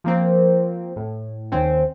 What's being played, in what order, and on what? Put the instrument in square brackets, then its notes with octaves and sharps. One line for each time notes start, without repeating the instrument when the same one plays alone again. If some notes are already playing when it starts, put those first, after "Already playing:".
[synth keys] F3 A#3 C4
A2
D#2 C4 C#4